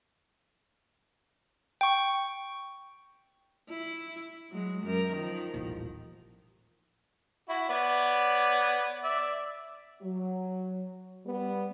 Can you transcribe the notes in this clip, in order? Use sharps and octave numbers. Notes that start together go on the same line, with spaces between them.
G5 C#6
E4
F#3 G#3
F#2 A#4
D#3 F3
D#1 A1
E4 F#4
B3 C#5 D5
D5 E5
F#3
G3 B3